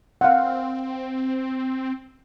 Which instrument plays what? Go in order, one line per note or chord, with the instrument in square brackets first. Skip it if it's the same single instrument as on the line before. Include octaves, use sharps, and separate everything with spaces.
[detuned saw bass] C4 [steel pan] F5 F#5